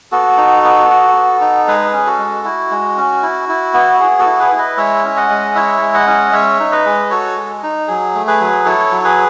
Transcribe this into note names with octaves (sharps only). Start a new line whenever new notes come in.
B3 F#4 A4
D#4
B3
F#4
B3
D#4
G#3 G#4 B4
C#4
F#4 A4
G#3
E4 F#4
G#3
C#4
E4
E4
B3
B3 G#4
F#4 A4
E4
G#4 B4
E4
B4 D#5
G#3 C#5 E5
C#4
D#5 F#5
G#3
E4 C#5 E5
G#3
D#5 F#5
C#4
G#3 C#5 E5
D#4
B4 D#5
G#3
F#4 A4 C#5
G#3
D#4
F#3 G#4
A3
G#4 B4
F#3
E4 A4 C#5
F#3
G#4 B4